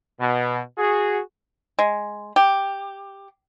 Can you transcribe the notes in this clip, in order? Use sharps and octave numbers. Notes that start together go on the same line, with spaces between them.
B2
F#4 G#4
G#3
G4